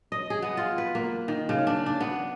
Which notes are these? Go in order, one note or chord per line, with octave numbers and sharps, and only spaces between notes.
D#5
G#4
B3
F4
B4
A#3
D#3
C#3
D4
D4
B3